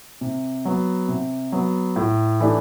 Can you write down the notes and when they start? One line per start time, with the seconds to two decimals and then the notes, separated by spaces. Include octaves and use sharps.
0.21 C3
0.65 F#3 B3
1.08 C3
1.52 F#3 B3
1.96 A2
2.40 E3 A3 D4 G4